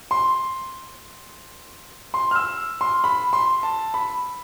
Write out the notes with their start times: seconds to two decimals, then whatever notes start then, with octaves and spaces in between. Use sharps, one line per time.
0.11 C6
2.14 C6
2.31 F6
2.35 E6
2.81 C6
3.04 B5
3.33 C6
3.63 A5
3.94 B5